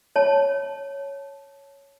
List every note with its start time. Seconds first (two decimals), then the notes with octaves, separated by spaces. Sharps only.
0.16 C#5 A5